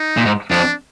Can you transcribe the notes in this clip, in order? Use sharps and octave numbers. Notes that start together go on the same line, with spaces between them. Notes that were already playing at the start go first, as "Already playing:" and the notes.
Already playing: D#4
A#2
G#2
F2 D4